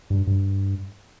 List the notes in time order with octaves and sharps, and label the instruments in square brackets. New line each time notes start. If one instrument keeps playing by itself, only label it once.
[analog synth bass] G2
G2